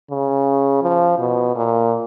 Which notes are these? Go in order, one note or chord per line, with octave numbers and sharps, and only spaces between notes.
C#3
F3
B2
A#2